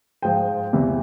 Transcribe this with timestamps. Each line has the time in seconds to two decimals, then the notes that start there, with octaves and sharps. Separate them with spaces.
0.22 G#2 F3 G5
0.73 E2 C3 E3